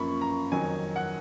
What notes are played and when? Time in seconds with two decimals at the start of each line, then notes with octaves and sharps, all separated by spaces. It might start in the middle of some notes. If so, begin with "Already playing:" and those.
Already playing: F#2 F3 A#3 B5 C#6
0.21 A#5
0.52 F2 D#3 F#3 G#5
0.96 F#5